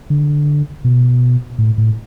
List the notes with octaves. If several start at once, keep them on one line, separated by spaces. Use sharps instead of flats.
D3
B2
A2
A2